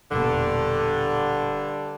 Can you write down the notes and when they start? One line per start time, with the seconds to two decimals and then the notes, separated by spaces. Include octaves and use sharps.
0.12 E1 G2 A#2 D3